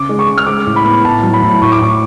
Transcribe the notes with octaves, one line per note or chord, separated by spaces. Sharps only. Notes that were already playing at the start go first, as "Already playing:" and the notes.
Already playing: C#3 D6
G#3
C#6
C#3
F6
G#3 D6
A2
B5
B3
A2 A5
F#3
B5
A2
A2 C#6
D6
A2 C#6